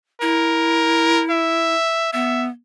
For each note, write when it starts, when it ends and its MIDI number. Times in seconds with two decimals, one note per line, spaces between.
0.22 1.74 64
0.22 1.24 70
1.31 2.10 76
2.13 2.49 59
2.13 2.47 76